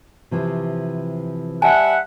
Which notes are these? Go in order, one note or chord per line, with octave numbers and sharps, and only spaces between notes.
C3 E3 F3
G3 E5 F#5 G#5 A5